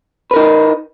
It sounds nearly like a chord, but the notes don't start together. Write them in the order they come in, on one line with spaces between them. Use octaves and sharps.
B4 A#4 D#4